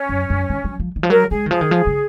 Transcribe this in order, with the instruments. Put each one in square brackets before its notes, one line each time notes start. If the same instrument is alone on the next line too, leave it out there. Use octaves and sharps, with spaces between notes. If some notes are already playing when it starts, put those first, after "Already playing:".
Already playing: [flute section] C#4
[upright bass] F#2
F#2
D#3
F#3
F3
D#3
F3
[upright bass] F#3 [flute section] A#4
[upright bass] G#3 [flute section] G#4
[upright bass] D#3
[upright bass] F3 [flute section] G#4
[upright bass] D#3
F3
C#3